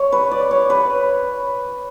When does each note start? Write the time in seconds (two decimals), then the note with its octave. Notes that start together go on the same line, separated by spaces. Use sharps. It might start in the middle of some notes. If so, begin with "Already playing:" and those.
Already playing: C#5
0.12 B4
0.31 D5
0.51 C#5
0.70 B4